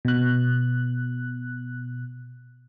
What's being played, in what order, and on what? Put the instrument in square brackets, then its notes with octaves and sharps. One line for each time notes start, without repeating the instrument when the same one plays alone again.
[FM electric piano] B2 F#6